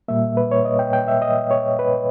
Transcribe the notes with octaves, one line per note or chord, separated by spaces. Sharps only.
A#2 G3 A#3 E5
B4
C#5
D#5
G5
G5
E5
D#5
C#5
B4